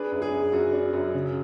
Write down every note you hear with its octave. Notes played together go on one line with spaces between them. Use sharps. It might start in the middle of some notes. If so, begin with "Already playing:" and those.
Already playing: D4 G#4 B4
F#2
G#4
F#2
F#2 F#4
D4
F#2
C#3